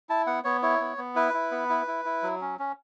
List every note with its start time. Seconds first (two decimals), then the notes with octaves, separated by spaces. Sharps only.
0.09 E4 A5
0.27 B3 F#5
0.44 B3 C#5
0.63 E4 C#5
0.81 B3
0.98 B3
1.15 E4 B4
1.34 E4
1.51 B3
1.69 E4
1.87 E4
2.05 E4
2.23 F#3
2.41 C#4
2.59 C#4